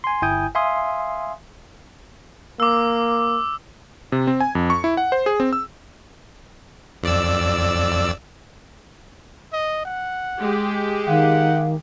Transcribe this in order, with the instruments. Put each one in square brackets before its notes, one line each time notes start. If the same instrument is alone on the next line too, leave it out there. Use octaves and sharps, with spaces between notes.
[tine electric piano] G#5 C6
G1 E4 G5 G#5 D#6 G6
E5 F5 G#5 C6 D#6
[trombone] A#3 [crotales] D6 E6
[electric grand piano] C3
C4
G#5
F2
C#6
E4
F#5
C5
G#4
C4
E6
[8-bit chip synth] F2 D5 E6
[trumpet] D#5
F#5
[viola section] G#3 G4
[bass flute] D#3 [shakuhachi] F5 [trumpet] F#5